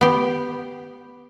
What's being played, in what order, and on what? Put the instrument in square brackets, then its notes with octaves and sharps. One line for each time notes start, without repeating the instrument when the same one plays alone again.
[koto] B3 G4